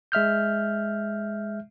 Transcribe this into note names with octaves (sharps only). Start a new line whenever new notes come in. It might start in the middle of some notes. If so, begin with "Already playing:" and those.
G#3 E5 F6 G6